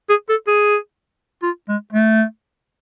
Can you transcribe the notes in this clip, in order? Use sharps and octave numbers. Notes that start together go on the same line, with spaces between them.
G#4
A4
G#4
F4
G#3
A3